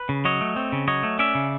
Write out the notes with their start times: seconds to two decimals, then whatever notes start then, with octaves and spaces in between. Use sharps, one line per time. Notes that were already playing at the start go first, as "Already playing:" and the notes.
Already playing: B4
0.09 C#3
0.25 F#3 C#5 D#5
0.41 A3
0.56 C4
0.72 C#3
0.88 F#3 C#5 D#5
1.03 A3
1.19 C#4 D5 E5
1.35 C#3